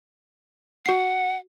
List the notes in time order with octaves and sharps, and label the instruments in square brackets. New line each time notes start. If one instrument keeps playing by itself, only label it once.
[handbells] F#4 C7 [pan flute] F#5